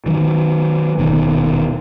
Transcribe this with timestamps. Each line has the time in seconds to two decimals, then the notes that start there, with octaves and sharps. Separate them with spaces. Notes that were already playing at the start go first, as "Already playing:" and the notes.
0.06 D#3 F#3
0.98 D#1 D#2 B2 D#3